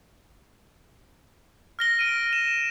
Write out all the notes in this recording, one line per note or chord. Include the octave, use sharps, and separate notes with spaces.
F6 A#6 G7
F6 D7 D#7
E7